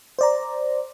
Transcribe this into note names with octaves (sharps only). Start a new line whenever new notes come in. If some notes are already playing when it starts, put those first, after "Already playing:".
C5 D5 A#5